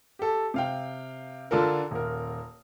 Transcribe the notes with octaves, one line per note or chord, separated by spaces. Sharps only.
G4 A4
C3 F5 G5
D3 D4 F4 A4 A#4
D#1 A#4